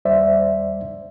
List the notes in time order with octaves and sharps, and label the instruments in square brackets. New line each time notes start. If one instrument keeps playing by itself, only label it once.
[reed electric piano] D#2 G3 C5 D5 E5